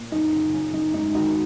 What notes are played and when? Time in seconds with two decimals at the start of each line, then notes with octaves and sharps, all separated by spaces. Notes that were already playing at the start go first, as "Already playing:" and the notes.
Already playing: A#2
0.12 F#2 D#4
0.33 C#3
0.54 F#2
0.74 F#2 D#4
0.94 G#2 D#4
1.15 D#3 D#4 F#4